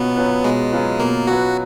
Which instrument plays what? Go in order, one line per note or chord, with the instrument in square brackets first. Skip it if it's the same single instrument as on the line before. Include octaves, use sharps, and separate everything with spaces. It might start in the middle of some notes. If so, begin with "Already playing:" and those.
Already playing: [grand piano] B2 F#3 C#4 F4 B4 [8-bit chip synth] B3
[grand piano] F#3 C#4 F4 B4
[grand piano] B2 [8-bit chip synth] G#3
[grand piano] F#3 C#4 F4 B4
[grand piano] B2 [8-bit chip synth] A#3
[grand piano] F#3 C#4 F4 B4 [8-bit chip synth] F#4